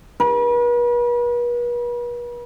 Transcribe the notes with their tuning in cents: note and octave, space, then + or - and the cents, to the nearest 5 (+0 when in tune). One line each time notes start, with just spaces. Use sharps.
B4 -40